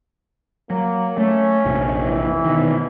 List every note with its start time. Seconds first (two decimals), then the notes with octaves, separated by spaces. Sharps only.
0.70 F#3 A#3
1.18 A3 C#4
1.65 A#1 F2 C3
2.04 E3
2.45 B2 D#3